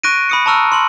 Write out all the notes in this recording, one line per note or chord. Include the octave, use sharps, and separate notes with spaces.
C#6 F#6 A#6 D7 D#7
B5 D#6 C#7
A5 A#5 C#6 E6 F6
C6 F#7